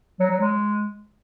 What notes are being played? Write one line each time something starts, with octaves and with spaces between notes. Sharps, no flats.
F#3
F#3
G#3